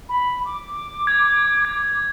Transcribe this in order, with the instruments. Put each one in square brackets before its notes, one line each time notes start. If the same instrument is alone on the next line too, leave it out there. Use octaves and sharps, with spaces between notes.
[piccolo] B5
D6
[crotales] G#6
G#6